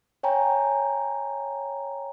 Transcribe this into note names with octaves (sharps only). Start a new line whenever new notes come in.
C#5 G5 G#5 A#5